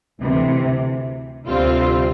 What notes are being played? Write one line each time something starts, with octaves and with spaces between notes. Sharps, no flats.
D2 C3 E3
D2 C3 G3 C4 F4